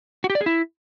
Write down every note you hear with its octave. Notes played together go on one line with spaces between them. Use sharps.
F#4
G4
D5
G#4
E4